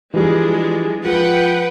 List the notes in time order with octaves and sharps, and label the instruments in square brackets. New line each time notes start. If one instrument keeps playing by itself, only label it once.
[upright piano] E3 F3 G3 [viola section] G#3 D4
[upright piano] F3 [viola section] B4 F#5 G5